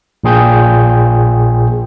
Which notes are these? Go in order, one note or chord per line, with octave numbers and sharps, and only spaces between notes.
A#1 A#2 G#4 G5 G6